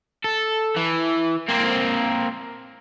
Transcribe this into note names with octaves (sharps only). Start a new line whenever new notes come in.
A4
E3
A#3 C4